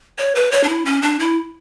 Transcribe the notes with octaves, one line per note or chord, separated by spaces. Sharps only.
C#5
B4
C#5
D4
E4
C#4
D4
E4